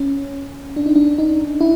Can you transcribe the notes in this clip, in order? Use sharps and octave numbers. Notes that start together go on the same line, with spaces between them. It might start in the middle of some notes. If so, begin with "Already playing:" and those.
Already playing: C#4
D4
D#4
D4
D#4
E4